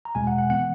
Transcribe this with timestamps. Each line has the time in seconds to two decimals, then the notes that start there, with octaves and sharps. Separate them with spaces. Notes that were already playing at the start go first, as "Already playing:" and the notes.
0.05 A#5
0.15 E2 B2 G#3 G#5
0.27 F#5
0.38 F#5
0.50 E3 B3 F#5